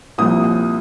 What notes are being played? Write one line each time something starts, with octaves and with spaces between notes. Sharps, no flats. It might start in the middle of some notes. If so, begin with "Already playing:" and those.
C2 A#2 F3 D#6
D#6